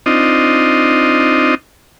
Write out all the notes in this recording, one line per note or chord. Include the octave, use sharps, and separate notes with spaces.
C4 D4 D#4 F4 D#5